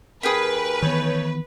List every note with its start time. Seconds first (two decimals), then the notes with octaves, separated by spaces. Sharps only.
0.23 D#2 G#4 A#4 B4 G5 B5
0.82 D#3 E3 A3 B3 D#4 C#5